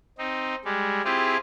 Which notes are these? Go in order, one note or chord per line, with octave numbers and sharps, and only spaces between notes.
C4 D#4
G3 G#3
C4 E4 F4 G4 G#4